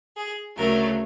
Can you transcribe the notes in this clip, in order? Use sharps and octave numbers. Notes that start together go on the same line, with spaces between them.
G#4
D2 C#3 F#3 A3 A#4